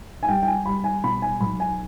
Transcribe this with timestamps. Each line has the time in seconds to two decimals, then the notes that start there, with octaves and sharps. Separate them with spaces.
0.23 G#5
0.28 G3 G5
0.43 G5
0.47 G#5
0.66 G3 B5
0.84 G#5
1.03 B2 B5
1.22 G#5
1.41 B1 B5
1.60 G#5